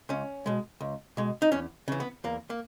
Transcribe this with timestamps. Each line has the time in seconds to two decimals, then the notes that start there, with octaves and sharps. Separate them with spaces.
0.09 C#2 C#4
0.46 B2 G#3
0.81 C#2
1.17 B2 G#3
1.42 D#4
1.52 E2 C#4
1.88 C#3 E3
2.00 B3
2.24 E2 A#3
2.50 A#3